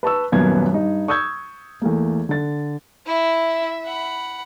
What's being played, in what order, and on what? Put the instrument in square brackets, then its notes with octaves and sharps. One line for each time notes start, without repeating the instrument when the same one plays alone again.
[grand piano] B4 A5 C#6 E6
D#1 F#2 A#3 B3 G#6
G2 D#4
C#6 D#6 E6 G6 G#6
E2 A3 A#3
D3 A6
[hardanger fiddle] E4 [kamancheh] E5
[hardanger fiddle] F#5 B5